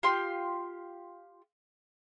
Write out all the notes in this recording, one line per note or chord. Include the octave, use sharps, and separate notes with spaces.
F4 G4 C6